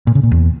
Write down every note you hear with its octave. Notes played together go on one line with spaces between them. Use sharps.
A#2
C#3
A#2
E2